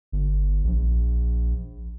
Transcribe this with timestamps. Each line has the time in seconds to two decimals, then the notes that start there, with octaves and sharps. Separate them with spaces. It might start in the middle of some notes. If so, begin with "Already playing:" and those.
0.12 G1
0.64 A#1